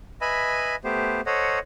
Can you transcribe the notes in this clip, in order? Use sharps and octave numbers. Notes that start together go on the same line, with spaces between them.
B4 D#5 E5 G#5 B5
A3 B3 G4 C5
A4 C5 C#5 D#5 F#5